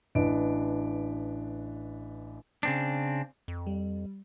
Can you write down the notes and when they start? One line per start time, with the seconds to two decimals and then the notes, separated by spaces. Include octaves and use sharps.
0.15 A1 D4 B4 D#5 D7
2.63 C#3 C4 D4
3.48 F2
3.67 G3